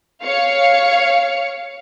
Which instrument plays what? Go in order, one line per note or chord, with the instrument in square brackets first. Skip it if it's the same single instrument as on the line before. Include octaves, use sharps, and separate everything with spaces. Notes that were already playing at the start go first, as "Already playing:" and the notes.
[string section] C#5 F5 C#7